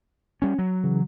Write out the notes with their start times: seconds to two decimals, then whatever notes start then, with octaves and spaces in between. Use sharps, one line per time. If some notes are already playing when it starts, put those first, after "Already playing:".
0.42 G3 C#4
0.58 F#3
0.84 C#3 E3